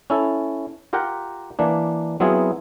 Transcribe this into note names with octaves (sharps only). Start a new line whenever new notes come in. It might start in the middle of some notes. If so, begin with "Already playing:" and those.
C#4 E4 A4
F4 G4 A#4 F#5 G5 A#5
E3 A#3 D4
F#3 B3 C4 E4 F4 G#4